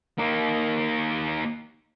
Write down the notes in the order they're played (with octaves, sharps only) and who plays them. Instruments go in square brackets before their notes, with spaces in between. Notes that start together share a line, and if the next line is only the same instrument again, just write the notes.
[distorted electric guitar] A#3 D#4